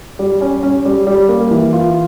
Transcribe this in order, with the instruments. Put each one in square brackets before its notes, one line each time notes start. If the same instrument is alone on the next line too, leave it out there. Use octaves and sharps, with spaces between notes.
[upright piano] G3
C#4
C#4
G3
G3
A#3
E3
F4